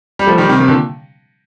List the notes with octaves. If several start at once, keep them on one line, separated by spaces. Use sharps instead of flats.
G3
F3 A3
D#3 G3
C3 D#3
C3 D#3
A#2 D3